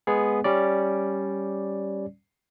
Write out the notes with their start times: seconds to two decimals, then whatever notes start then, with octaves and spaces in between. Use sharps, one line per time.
0.07 G#3 B3 G#4
0.44 G3 C#4 D5